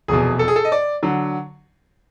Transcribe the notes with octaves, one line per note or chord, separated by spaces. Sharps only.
F1 E2 B2 G#4
A4
G#4
A4
D#5
D5
D3 F#3